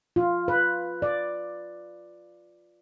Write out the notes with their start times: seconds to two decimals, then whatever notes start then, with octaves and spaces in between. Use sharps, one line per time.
0.16 F4
0.48 B4
1.02 D5